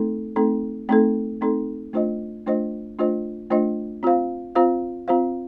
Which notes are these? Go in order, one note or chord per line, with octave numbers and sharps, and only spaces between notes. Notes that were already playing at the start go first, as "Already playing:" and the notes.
Already playing: A3 C4 D#4 A4
A3 C4 D#4 A4
A3 C4 D#4 A4
A3 C4 D#4 A4
A3 D4 F4 C5 D#5
A3 D4 F4 C5 D#5
A3 D4 F4 C5 D#5
A3 D4 F4 C5 D#5
C4 F4 C5 F5
C4 F4 C5 F5
C4 F4 C5 F5